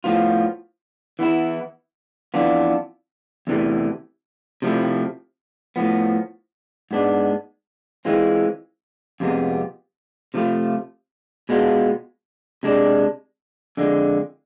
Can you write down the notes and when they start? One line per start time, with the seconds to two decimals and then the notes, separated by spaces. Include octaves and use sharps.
0.04 A2 F3 B3 F4
1.19 E3 B3 E4
2.34 F2 E3 B3 D4 F4
3.47 E2 C3 E3 A3
4.62 C3 F3 A3 E4
5.76 A2 F3 B3
6.91 G#2 G#3 B3 D4
8.05 E3 G#3 C4 F4
9.20 F2 C3 G#3 B3
10.34 C3 F3 A3 D4 F4
11.49 B2 G#3 B3 F4
12.63 C3 G#3 D4
13.77 F2 D3 G#3